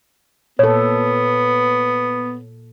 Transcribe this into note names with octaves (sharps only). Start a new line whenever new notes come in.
A#2 B3 A4 C#5